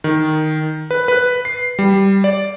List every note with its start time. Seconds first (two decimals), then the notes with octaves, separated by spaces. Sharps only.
0.04 D#3
0.91 B4
1.08 B4
1.45 C7
1.79 G3
2.24 D5